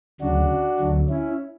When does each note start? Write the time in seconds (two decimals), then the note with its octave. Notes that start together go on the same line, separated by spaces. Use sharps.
0.21 D2 C#3 F#3 D4 F#4
0.79 D2 D3 F#3
1.09 C#4 E4